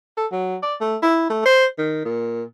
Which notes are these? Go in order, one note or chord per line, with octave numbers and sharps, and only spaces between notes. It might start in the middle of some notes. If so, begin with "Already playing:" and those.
A4
F#3
D5
A3
E4
A3
C5
D#3
A#2